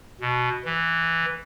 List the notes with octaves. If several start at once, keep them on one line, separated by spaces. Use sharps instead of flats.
B2
E3